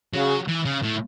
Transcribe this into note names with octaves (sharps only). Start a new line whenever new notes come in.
C#3 F#3
E3
C#3
A2